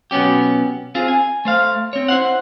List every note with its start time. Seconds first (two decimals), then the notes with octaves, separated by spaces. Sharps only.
0.11 B2 F#3 B3 C#4 G4
0.95 C4 F4 G#4
1.08 G#5
1.45 A3 C5 F5
1.93 C4 C#5
2.08 E4 C5 F#5